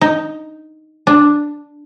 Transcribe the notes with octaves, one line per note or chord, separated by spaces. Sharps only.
D#4
D4